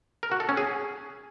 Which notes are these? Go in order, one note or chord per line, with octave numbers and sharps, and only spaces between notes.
A#4
F#4
A4
C#4
G#4